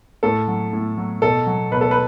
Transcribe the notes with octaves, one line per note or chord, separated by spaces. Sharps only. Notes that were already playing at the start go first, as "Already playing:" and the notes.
A2 A4
F#3
A2
F#3
B2 A4
F#3
B2 B4
A4
B4